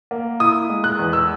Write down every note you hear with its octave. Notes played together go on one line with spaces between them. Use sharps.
A#3
E4 D#6
G#3
F#6
E2
E6